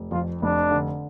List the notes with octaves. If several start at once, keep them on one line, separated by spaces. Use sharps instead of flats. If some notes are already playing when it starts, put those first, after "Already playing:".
Already playing: F1
F2 F4
F1 D4
D3